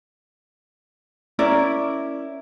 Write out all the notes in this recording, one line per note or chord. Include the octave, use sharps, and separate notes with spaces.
C#4 E4 A#4 D5